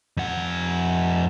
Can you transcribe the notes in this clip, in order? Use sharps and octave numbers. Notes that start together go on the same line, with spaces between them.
F2 F#5